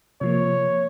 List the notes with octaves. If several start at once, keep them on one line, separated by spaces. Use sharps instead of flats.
C3 F3 A#3 C#5